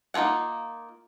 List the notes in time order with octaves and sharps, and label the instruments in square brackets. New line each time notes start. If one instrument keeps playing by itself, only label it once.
[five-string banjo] A#3 D#4 F4 G#4 F#5